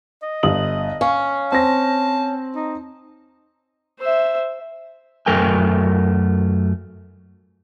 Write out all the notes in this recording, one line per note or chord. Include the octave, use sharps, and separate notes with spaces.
D#5
G1 D#6 F#7
C#4 F5
C4 A5 A#6
D#4
C5 E5
F#2 A3 A#4 G5 G#5